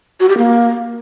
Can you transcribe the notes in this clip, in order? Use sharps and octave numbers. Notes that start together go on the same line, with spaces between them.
F#4
G4
A#3